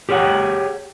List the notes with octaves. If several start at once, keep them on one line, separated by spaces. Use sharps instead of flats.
G4 G#4 C#5 D#5 F#5 G5